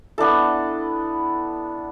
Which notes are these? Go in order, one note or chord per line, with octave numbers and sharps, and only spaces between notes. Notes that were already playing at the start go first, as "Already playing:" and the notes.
B3 D4 E4 A4